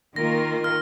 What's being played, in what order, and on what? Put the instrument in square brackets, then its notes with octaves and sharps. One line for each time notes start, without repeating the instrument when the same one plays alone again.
[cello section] D#3 A#3 F4 A#4 [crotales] A#6
[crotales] F6